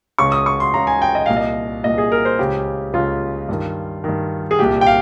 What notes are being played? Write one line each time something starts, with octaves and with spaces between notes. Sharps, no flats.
C#2 C#3 C#6
D#6
C#6
C6
C#2 C#3 A#5
G#5
G5
D#5
C2 A#2 F5
D#5
C2 A#2 D#5
G#4
A#4
C5
C#2 C#3 G4
C#2 C#3 F4
G2 D#3
G2 D#3
G#4
C2 A#2 G4
G5
F5